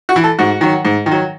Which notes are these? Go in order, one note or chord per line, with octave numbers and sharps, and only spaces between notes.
F#4
E3
A4
G#2 F#4
D#3 F#3
G#2
D#3
F#3